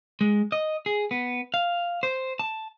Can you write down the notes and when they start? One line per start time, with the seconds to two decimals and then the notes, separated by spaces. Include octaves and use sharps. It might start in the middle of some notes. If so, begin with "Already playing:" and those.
0.21 G#3
0.52 D#5
0.86 G#4
1.11 B3
1.54 F5
2.03 C5
2.39 A5